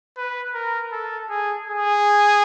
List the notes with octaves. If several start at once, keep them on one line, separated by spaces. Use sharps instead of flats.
B4
A#4
A4
G#4
G#4